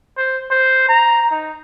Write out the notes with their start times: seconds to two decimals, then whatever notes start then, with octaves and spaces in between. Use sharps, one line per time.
0.17 C5
0.51 C5
0.89 A#5
1.31 D#4